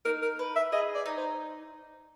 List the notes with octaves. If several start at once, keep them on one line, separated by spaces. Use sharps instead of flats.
D#4 A#4
A#4
B4
E5
G#4 D#5
D5
D#4
C5